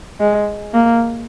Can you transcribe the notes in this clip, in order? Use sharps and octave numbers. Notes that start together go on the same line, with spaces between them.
G#3
A#3